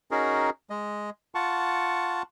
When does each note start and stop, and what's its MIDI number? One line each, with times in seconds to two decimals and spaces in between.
0.11 0.50 61
0.11 0.50 63
0.11 0.50 66
0.11 0.50 68
0.11 0.50 70
0.70 1.10 56
0.70 1.10 75
1.35 2.22 65
1.35 2.22 78
1.35 2.22 81
1.35 2.22 85